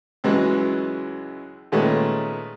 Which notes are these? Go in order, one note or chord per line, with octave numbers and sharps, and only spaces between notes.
C#2 E3 F#3 G#3
A#2 D#3 G#3 A3 B3 C#4